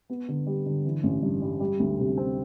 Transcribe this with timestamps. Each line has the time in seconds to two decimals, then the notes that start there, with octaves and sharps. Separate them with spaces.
0.10 B3
0.28 D3
0.47 G3
0.66 D3
0.85 E3
1.03 A1
1.22 G2
1.42 G3
1.60 G3
1.80 D2
1.99 C3
2.17 C4